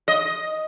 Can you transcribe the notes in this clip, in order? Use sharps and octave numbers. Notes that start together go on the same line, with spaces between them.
D#5